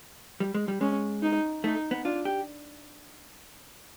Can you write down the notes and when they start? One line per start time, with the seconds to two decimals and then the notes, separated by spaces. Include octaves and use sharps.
0.40 G3
0.54 G#3
0.68 G3
0.81 G#3 C#4
1.22 D#4
1.64 A3 D#4
1.91 B3
2.05 D4 F4
2.25 G4